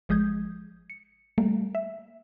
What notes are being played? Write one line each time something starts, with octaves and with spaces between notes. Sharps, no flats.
G#1 F3 G#3 D#6 G6 G#6
C#7
G3 A3 A#3
E5